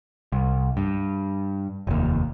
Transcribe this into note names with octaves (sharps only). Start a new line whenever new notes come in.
C2
G2
F1 D#2